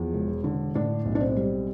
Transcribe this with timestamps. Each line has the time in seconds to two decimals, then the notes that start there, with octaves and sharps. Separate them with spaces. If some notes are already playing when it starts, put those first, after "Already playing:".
Already playing: E2 F3
0.14 E1
0.44 D3
0.75 A2 D4
1.06 B1
1.15 D4
1.20 C4
1.37 G3